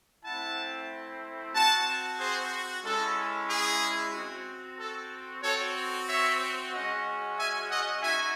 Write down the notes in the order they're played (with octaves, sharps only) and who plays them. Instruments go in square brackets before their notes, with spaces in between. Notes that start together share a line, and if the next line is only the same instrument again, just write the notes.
[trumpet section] A3 C4 E4 F#5 A5
C4 F#4 F#5 A5
G#4 C5
G#3 C#4 E4 A4
G#4
C4 F#4
A4
C4 F#4 A4 C#5
C#5 E5
G#3 C#4 F#4 D#5 F#5
E5 G#5
D#5 F#5
D#4 F#4 E5 G#5